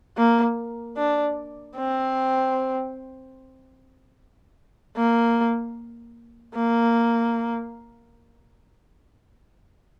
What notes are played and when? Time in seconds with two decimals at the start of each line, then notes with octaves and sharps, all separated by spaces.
0.17 A#3
0.97 D4
1.77 C4
4.96 A#3
6.55 A#3